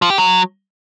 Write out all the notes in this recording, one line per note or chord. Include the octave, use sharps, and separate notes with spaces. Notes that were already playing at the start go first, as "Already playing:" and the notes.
F3
G4
F#3